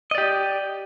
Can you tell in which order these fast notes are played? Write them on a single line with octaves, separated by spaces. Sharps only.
D#5 D5 G4